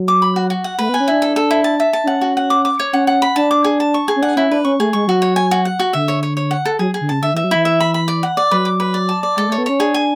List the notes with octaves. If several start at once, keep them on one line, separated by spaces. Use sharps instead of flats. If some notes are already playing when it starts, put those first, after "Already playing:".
Already playing: F#3
D6
B5
F#4
F#4
F#5
A3 B4
B3
G#5
C#4
D4 E4
A4
A4
E4
A5
E5
A5
D4
C#4 F#5
F#4
F#5
D6
D6
C#5
C#4 F#5
F#5
B5
D4 A5
D6
G#4
A5
C#6
G#4
C#4
D4 F#5
C#4 E4
D4 B4
C#4 C#6
A3 G#4
G#3 C#6
F#3 F#4
C#5
G#5
F#4
F#5
F#4
D3 E5
C#5
C#5
C#5
F#5
A4
F#3 G#4
G#4
D3
C#3 A5
D3 E5
E3 E5
F#3
E3 E4
E5
B5
B5
D5
F#5
D5
F#3 B4
D6
B4
D5
A5
D5
G#3 A4
A3
C#5
B3
C#4 C#5
D4 G#4
G#5